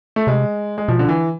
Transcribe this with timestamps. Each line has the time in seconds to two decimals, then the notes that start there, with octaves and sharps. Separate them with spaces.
0.16 A3
0.27 C3 G#3
0.78 G#3
0.88 B2 F3
0.99 D3
1.09 E3